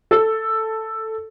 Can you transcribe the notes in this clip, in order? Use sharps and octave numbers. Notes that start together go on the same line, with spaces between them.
A4